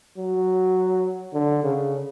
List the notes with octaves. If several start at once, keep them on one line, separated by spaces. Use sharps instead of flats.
F#3
D3
C#3